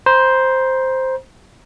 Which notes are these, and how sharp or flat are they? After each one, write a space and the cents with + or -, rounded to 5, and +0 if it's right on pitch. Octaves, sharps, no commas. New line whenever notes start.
C5 +0 A#5 +40